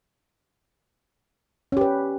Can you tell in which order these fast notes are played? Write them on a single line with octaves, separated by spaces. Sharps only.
C#4 G4 B4